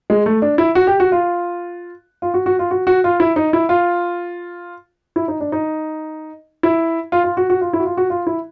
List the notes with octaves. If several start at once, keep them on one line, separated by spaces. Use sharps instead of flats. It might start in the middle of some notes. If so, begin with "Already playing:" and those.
G#3
A3
D4
E4
F#4
G4
F#4
F4
F4
F#4
F#4
F4
F#4
F#4
F4
E4
D#4
E4
F4
E4
D#4
D4
D#4
E4
F4
F4
F#4
F#4
F4
E4
F#4
F4
F#4
F4
E4